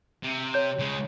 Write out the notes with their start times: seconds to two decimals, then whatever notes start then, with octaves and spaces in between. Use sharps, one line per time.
0.24 C3
0.54 C#5 G6
0.79 C#3 G#3